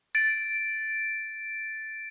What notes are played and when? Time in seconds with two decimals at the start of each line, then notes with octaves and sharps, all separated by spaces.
0.15 A6 D7